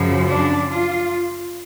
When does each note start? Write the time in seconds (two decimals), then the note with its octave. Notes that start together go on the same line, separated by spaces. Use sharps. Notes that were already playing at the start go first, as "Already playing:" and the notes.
Already playing: F#2 C#3 F3
0.27 D4
0.71 F4